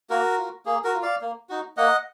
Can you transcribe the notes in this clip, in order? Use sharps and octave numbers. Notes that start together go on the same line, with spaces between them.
A#3 F#4 A#4
F4
A#3 G#4
F#4 A#4
F4
D5 F5
A#3
D#4 F#4
A#3 D#5 F#5